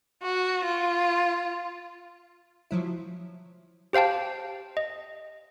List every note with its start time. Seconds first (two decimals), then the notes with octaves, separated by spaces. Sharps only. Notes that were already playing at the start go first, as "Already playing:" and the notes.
0.23 F#4
0.65 F4
2.71 F3 F#3 E4
3.93 G4 C5 F5 G5 A5
4.77 D#5